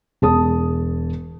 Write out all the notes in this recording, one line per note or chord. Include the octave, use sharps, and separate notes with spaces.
E1 G#4 A5 D#6